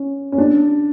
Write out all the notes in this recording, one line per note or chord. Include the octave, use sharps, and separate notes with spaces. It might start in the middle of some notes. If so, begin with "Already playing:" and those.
Already playing: C#4
C#4
D4